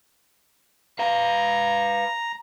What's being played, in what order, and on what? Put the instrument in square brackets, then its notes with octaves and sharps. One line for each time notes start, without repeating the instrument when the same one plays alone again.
[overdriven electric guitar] B4 F5 [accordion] A#5